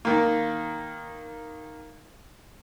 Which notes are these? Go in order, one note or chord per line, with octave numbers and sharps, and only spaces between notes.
D#3 A#3